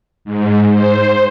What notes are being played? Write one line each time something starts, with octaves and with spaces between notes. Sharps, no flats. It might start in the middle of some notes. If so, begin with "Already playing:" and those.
G#2
C5